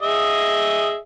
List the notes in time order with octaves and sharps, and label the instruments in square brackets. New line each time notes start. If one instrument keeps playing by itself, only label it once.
[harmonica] G#4 D#5 E5